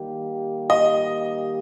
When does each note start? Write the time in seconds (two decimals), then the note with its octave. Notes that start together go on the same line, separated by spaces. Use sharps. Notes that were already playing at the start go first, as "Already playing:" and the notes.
Already playing: D#3 G3 A#3 G4
0.70 D#5